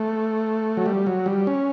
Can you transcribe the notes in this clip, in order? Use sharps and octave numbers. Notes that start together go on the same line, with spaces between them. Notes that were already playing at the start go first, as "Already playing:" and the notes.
Already playing: A3
F#3
G3
F#3
G3
C#4